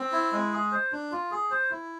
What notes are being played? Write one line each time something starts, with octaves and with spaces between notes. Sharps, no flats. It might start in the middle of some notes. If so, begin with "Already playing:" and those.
Already playing: C4
E4
G#3
G#4
C5
D4
F4
G#4
C5
E4